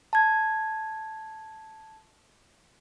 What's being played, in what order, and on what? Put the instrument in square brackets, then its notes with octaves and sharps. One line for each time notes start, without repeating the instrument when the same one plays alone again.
[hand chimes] A5 G#6